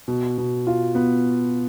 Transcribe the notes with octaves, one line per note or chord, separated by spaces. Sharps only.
B2
B2
F4
B3